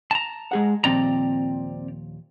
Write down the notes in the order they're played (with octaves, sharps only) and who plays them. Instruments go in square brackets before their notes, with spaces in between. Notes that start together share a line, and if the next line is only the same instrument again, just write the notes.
[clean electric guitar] A5 A#5
[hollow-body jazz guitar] G#3 G#4 F#5
[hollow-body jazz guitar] D#2 A#2 F3 [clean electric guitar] C4 D5 A#5